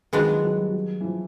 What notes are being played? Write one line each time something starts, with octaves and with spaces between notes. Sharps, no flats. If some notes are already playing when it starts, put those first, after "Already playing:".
D#3 F3 G#3 B3 D4 F#4
F#3
F#3
G3
F#3
E3
F3